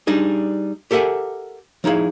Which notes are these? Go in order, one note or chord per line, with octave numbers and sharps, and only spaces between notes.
G3 D4 D#4 G#4
G4 A4 A#4 E5 F#5 G#5
F3 D#4 E4 G#4 F5